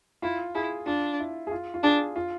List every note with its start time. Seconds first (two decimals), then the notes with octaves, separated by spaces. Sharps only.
0.22 E4 F4
0.55 E4 G#4
0.86 D4 F4
1.19 E4
1.47 G#4
1.51 F4
1.74 F4
1.83 D4 G#4
2.16 F4